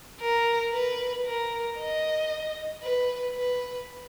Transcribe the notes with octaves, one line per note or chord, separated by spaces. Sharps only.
A#4
B4
A#4
D#5
B4
B4